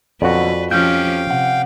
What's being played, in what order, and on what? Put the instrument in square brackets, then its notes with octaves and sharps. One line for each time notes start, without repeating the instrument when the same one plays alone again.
[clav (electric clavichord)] F2 F#4 [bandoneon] B2 D3 F#3 [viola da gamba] B4 [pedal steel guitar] D5
[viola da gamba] F3 C#4 G4 [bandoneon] F5 G5 [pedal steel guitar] F6 G6
[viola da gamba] C3 [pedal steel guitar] F#5